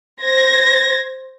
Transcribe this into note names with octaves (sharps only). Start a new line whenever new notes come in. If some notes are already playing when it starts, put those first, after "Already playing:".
C5 G#6 A#6